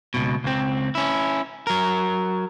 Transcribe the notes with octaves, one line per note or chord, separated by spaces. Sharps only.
C#2 F#2 B2
C#2 C4
C#4 E4
F#3 A#4